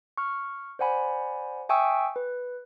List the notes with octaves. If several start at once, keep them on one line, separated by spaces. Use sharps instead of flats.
C#6 F6
C5 D5 F#5 G#5 B5
E5 G5 G#5 C#6 D#6 E6
B4